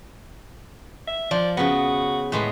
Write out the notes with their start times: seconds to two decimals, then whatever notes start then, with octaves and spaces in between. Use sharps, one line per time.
1.08 E5
1.31 F3 D5
1.57 C#3 B3 F#4
2.32 A2 G#3 B3